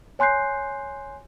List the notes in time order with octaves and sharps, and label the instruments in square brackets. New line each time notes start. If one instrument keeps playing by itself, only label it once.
[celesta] C#5 G#5 C6 F#6 G6 C7